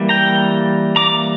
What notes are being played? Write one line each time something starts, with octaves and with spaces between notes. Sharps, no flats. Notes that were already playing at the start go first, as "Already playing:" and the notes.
Already playing: E3 G3 A#3
G5 A#5
A#5 D6